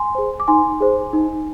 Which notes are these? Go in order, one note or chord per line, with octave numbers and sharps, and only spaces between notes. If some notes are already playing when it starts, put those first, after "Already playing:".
Already playing: G#5 C6
G#4 C5
D6
D#4 G#5 C6
G#4 C5
D#4